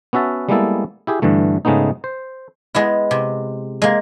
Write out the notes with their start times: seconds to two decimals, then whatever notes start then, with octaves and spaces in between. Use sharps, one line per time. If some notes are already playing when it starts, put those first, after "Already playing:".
0.13 B3 C#4 F#4 E5 A5
0.49 G3 G#3 A#3 B3 E4 A4
1.07 E4 G4 G#4
1.22 G2 D3 E3 A3
1.65 G#2 C#3 G#3 A3 B3 D#4
2.04 C5
2.75 G#3 B3 E4
3.11 C3
3.82 G#3 A#3